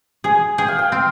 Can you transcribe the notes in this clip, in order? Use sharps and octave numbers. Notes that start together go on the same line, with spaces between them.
G#4 G#5
G#4 G5
F5
G5
C4 F5